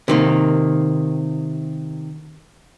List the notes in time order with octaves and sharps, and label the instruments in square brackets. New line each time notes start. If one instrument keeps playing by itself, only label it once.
[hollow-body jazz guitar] C3 D#3 A#3